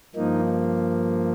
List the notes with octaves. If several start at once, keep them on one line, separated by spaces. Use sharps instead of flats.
G2 F3 A#3 D#4